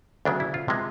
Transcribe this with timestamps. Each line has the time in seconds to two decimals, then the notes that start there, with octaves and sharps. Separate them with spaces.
0.25 D2 C#3 F#3 B3 D4
0.40 E4
0.54 F4
0.68 C3 F3 G#3 B3